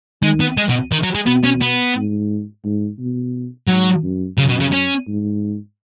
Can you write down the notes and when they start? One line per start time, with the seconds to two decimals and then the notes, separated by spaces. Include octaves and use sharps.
0.22 D#3 G#3
0.40 B3
0.57 G#3
0.69 B2
0.92 D#3
1.03 F#3
1.15 G#3
1.26 B2 B3
1.44 C#4
1.61 B3
1.96 G#2
2.65 G#2
2.99 B2
3.69 G#2 F#3
4.03 F#2
4.38 F#2 C#3
4.49 B2
4.61 C#3
4.73 C#4
5.08 G#2